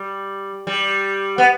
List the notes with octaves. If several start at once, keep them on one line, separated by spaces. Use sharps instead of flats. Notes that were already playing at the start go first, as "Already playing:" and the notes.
Already playing: G3
G3
B3